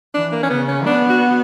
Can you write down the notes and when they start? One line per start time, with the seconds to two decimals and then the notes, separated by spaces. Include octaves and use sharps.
0.14 E3 D4
0.32 A#3
0.43 C#4
0.50 C#3 B3
0.68 C#4
0.86 B3 D4
1.10 F#4